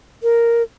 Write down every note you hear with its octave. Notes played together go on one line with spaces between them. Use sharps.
A#4